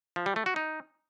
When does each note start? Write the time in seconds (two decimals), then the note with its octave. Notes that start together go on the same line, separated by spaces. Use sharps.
0.16 F3
0.26 G3
0.36 A3
0.46 F#4
0.56 D#4